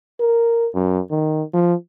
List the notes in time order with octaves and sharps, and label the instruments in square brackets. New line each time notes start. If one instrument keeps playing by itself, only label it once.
[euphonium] A#4
F#2
D#3
F3